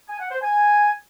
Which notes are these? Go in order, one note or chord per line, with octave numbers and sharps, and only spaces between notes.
G#5
F#5
C5
G#5